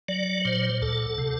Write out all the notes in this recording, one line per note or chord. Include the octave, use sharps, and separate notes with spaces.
F#3 D5
A#2 C5
D2 A4
C3